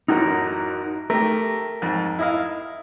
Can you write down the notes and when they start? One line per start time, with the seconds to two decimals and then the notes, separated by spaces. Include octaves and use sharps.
0.08 A1 F#2 D#4 F#4 A#4
1.10 A3 G4 A#4
1.82 F2 G#2
2.19 E4 D#5 F5